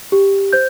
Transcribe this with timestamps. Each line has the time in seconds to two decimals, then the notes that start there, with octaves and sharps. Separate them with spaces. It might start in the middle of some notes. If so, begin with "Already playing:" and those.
0.12 G4
0.53 C5 G6